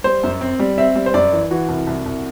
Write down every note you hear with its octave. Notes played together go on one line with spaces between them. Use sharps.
G3 C5
F#2
C4
G3
C4 E5
G3
C5
F#2 D5
E3
E3 F#4
C2
C2
C2